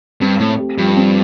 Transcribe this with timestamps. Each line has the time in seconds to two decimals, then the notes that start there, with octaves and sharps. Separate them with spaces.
0.21 G2 C4
0.40 A2 A3
0.59 G4
0.78 G2 F3
0.97 C4